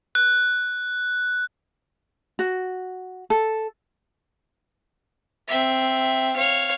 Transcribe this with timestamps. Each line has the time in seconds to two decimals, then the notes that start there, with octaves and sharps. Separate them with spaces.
0.15 F#6
2.39 F#4
3.30 A4
5.48 C4 E5
6.35 C#5 F5